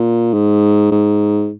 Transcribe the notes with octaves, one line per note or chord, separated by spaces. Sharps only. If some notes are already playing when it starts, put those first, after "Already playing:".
Already playing: A#2
G#2
G#2